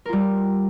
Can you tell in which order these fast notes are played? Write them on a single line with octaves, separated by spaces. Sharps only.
A#4 F4 G3